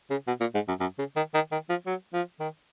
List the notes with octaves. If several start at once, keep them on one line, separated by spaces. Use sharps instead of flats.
C#3
B2
A#2
G#2
F#2
F#2
C#3
D#3
D#3
D#3
F3
F#3
F3
D#3